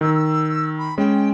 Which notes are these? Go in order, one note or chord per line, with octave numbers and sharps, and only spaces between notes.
D#3 E6
E6
B5
G#3 C#4 G5